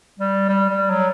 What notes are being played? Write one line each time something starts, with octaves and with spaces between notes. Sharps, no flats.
G3
G3
G3
F#3